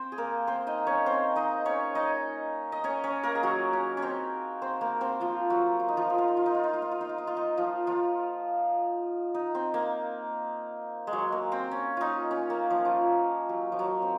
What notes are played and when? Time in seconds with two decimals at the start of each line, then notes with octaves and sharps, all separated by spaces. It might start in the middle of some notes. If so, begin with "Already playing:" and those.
Already playing: C4 C5
0.12 G#4
0.18 A#3 A#4
0.47 C4 C5
0.67 D#4 D#5
0.87 C#4 C#5
1.06 C4 C5
1.36 D#4 D#5
1.65 C#4 C#5
1.95 D#4 D#5
2.72 D#5
2.84 C#4 C#5
3.04 C#4 C#5
3.23 A#3 A#4
3.35 G#4
3.43 F#3 F#4
3.73 C#4
3.97 C#4
4.02 C4
4.62 C4 C5
4.81 A#3 A#4
5.01 C4 C5
5.20 F3 F4
5.50 F#3 F#4
5.80 F4
5.88 D#4
5.97 F3 F4
6.10 D#4
6.18 F4
6.28 D#4
6.37 F4
6.46 D#4
6.54 F4
6.64 D#4
6.73 F4
6.82 D#4
6.92 F4
7.01 D#4
7.09 F4
7.18 D#4
7.27 F4
7.37 D#4
7.57 F3 F4
7.87 F3 F4
9.34 D#4
9.55 C4
9.74 A#3
11.07 G#3
11.13 F#3
11.32 A#3
11.52 C4
11.71 C#4
11.97 D#4 F4
12.31 C#4
12.50 A#3
12.70 F3
12.85 F3
13.49 F#3
13.72 F3
13.79 F#3
14.02 C4